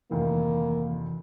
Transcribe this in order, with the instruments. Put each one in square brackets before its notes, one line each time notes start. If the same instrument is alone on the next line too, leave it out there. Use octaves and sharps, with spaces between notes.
[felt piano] F1 D2 D#3 [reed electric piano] E3 [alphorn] A#3